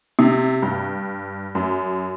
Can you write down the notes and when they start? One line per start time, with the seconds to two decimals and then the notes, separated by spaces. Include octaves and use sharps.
0.19 C3
0.62 G2
1.55 F#2